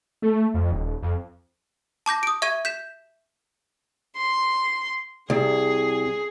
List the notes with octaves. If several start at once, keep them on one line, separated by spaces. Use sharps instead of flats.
A3
F2
D#1
F2
A5 D6 G6 A#6
D#6 D7
E5 C#6 G#6 D#7
G6 B6 E7
C6
C2 G#4